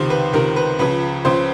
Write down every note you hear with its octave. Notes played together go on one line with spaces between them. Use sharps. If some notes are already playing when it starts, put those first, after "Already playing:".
Already playing: C#2 C3 D#3 C5
B4
C#2 C3 D#3 A#4
B4
C#2 C#3 F3 B4
C#2 C#3 F3 C5